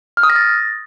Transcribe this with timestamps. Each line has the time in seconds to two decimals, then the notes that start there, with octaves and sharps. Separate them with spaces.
0.17 F6
0.23 D#6
0.30 A#6
0.36 A6